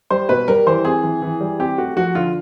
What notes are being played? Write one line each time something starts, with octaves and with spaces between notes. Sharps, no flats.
G3 C5
B2 B4
G3 A#4
E3 C5
C4 G#4
E3
E3
G3
C4 G4
A3 F#4
F3 F#4
D3 F4